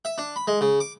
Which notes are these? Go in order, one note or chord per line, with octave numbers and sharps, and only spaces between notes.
E5
D4
B5
G#3
C#3
D6